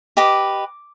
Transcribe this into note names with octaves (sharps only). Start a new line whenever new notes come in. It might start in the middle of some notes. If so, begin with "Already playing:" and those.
G4 B4 D#5 D6